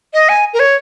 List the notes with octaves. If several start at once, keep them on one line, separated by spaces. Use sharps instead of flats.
D#5
G#5
A#4
C#5